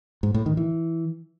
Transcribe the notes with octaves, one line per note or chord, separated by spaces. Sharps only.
G#2
A2
D#3
E3